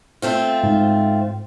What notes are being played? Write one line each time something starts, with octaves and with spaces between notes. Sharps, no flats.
A3 C4 F4
G#2